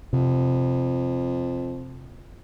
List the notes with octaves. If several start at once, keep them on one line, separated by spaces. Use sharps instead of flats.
F2 C3